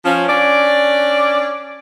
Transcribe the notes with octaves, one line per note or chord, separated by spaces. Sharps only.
F3 C#4
C#4 D4 D5